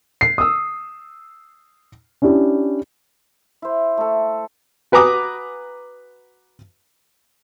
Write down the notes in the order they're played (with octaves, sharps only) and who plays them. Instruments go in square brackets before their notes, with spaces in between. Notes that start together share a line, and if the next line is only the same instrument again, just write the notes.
[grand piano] C7
D#6 E6
C#4 D4 E4 G4
[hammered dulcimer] E4 C5
A3 A4
[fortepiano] F#4 B4 G#5 A#5 D6 D#6